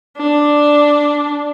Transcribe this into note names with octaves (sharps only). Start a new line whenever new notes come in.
D4